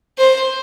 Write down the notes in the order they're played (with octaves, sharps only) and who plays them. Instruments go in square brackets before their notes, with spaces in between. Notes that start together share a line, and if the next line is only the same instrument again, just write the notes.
[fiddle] C5